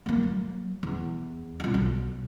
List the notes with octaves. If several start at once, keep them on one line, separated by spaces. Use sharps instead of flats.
A3 A#3
F#3
E2
C2 F4
B1